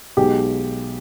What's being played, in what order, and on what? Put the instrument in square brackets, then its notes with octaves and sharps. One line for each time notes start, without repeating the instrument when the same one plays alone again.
[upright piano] B1 B2 G#3 G4